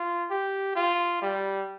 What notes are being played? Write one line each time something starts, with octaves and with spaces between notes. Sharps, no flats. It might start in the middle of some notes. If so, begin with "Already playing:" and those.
Already playing: F4
G4
F4
G3